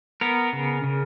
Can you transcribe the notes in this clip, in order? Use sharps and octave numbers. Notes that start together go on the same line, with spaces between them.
B3 A#4
C#3
C#3